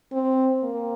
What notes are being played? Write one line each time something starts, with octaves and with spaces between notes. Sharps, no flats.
C4
A#3